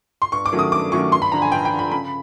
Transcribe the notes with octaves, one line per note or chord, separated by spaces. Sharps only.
C6
G2 C#6
D6
D#3 F#3 A3 C#4
D#6
G2 D6
D#3 F#3 A3 C#4 C#6
G2 C6
B5
D3 F3 A#5
G#5
G2 G5
G5
D3 F3
B5
C#3 B5